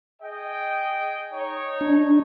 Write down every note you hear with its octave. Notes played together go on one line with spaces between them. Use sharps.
G#4 D#5 G5
D#4 C#5
D4